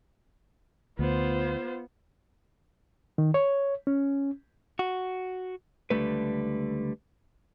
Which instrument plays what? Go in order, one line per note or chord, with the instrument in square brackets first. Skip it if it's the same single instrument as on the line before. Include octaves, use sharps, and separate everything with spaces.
[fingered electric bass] D2 [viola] B3 [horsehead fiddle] F4 C5
[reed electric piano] D#3
C#5
C#4
[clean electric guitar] F#4
C#2 D3 G3 A3 B4